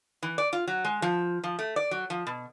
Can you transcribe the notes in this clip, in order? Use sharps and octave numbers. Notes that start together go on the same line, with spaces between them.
E3
D5
F4
F#3
G#3
F3
F3
A3
D5
F#3
F3
B2